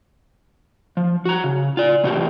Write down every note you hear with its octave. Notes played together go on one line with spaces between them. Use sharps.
F3
F#4 A#5
C#3
F4 D5
A2 C3 E3 F#4 G4